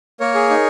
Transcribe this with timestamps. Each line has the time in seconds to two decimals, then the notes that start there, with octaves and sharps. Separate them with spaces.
0.20 A#3 A#4 C#5
0.35 G#4
0.50 D#4